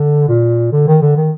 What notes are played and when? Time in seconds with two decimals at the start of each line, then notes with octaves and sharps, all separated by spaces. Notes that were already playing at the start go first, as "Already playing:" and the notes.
Already playing: D3
0.28 A#2
0.73 D3
0.88 D#3
1.02 D3
1.17 D#3